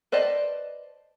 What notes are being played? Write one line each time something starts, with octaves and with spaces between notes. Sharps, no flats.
B4 C5 D5 D#5 A5